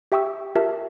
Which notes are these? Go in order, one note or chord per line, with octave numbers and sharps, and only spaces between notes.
G4 E5 G5 C#6 D#6 E6
F4 G4 A#4 E5 A5